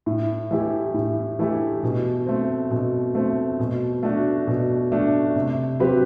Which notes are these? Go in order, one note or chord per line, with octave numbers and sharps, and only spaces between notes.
A2
E3 A3 E4 G4
A2
E3 A3 E4 G4
B2
A3 C4
B2
A3 C4
B2
A3 D4 F#4
B2
A3 D4 F#4
C3
F#3 C4 G4 B4